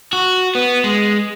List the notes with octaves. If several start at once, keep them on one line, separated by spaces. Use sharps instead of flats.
F#4
B3
G#3